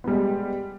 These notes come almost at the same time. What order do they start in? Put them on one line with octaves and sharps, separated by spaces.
B3 G3 G#3